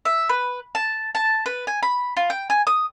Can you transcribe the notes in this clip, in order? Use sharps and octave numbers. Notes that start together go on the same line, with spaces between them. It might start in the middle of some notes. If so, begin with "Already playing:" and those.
E5
B4
A5
A5
B4
G#5
B5
F4
G5
G#5
D#6